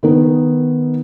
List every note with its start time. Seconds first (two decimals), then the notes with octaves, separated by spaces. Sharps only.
0.03 D#3 B3 D#4